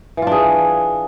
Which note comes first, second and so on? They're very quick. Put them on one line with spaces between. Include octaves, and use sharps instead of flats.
E3 F4 D4 G#4